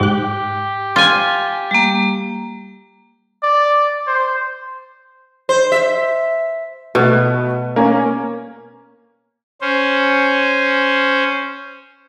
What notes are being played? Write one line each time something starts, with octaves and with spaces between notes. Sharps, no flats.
G#2 G4 F#6
F4 G#5
G3 A#3
D5
C5
C5
E5
B2 A3 B3 F#4
A#3 C#4
C#4 C5